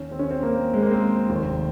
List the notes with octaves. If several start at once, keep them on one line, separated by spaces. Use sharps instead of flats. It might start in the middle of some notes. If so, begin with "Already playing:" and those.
Already playing: D#2 D#3 C#4
C4
C#4
C4
A#3
G#3
A#3
C4
F1 D#2 D#3